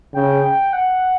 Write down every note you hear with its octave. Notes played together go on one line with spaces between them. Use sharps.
C#3 G5
G5
F#5